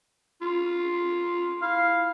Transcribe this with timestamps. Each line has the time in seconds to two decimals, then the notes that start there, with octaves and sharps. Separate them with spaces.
0.41 F4
1.62 E4 F5